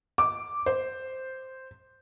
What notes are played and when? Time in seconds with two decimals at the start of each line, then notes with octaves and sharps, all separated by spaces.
0.18 D6
0.66 C5